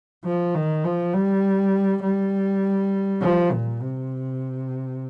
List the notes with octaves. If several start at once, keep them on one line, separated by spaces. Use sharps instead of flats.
F3
D#3
F3
G3
G3
F3
A#2
C3